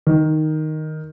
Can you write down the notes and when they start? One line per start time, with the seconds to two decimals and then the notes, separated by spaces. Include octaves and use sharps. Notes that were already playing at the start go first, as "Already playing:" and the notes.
0.07 D#3